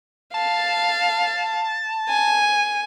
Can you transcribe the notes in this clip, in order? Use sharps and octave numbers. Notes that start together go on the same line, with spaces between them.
F5 A5
G#5